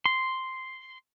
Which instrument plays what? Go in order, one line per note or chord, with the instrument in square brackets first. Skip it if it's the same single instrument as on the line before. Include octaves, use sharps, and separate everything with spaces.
[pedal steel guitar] C6